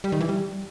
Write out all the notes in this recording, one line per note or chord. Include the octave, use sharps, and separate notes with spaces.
G3
D#3
E3
G3